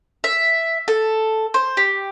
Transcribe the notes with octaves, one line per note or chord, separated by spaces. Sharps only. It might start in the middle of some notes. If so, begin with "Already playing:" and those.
E5
A4
C5
G4